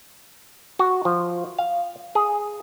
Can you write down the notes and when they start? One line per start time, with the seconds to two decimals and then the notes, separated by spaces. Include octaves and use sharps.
0.79 F#4
1.05 F3
1.58 F5
2.15 G#4